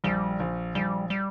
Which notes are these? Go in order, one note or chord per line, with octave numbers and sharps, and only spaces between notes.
A#1 G3
A#1
A#1 G3
G3